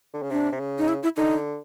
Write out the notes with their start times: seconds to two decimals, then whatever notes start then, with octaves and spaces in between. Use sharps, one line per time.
0.14 D3
0.23 C#3
0.31 C3 D4
0.52 C3
0.60 C#3
0.78 D#4
0.88 E4
1.03 E4
1.17 D3 D#4